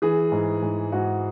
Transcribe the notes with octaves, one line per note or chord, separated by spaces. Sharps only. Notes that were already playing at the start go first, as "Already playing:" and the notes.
E3 G#4
G#2
G#2
G#2 F#4